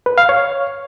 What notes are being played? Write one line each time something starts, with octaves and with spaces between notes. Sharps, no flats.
B4
F5
C#5